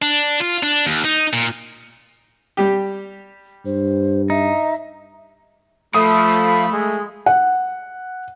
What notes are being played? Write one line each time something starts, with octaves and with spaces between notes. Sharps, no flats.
D4
F4
D4
D#2
D#4
A#2
G3 G4
G2 C5
D#4 E5
F3 A3 B5 D#6
G#3
F#5